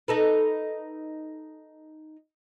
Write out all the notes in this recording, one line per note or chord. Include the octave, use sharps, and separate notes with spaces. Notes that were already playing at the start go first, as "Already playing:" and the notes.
D#4 A4 B4